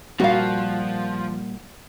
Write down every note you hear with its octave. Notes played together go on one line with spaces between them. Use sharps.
A#2 F3 G3 A#3 F#4 F5